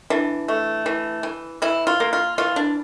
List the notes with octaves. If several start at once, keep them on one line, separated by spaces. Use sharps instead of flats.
E3 D4
A3
E3
E3
E3 E4
F4
A#3
F4
E3 F4
D4